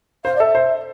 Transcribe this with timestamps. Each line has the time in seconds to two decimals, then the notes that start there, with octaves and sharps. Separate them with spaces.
0.24 C5 F5
0.35 D5
0.40 A4 E5
0.55 C5